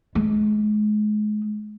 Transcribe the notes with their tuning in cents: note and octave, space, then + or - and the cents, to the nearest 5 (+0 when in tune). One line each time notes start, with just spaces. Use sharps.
G#3 +30